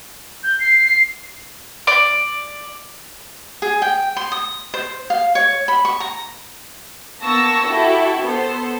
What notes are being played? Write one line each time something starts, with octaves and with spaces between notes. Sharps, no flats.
G6
C7
D5
G#4
G5
C6
D#6
C5
F5
C#5
B5
C#6
A#5
A#3 B3 A5 C#6 E6 A#6
E4 F#4 G4 A4
B3 A4 C5